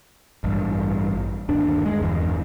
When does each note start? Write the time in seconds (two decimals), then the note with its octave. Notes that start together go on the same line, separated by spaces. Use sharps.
0.44 A1 G2
1.49 G1 D#2 D4
1.85 G#3
2.00 G1 E2